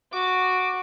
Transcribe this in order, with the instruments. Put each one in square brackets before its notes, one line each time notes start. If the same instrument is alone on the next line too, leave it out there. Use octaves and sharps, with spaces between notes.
[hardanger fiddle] F#4 [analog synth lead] D6